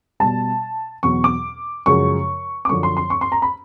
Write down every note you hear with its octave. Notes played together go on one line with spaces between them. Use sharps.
B2 G3 A5
E2 B2 F#3 C#6
D6
F#2 C#3 F3 G#3 C#6
D6
F#2 D3 F3 C#6
C6
C6
C#6
C6
A#5
B5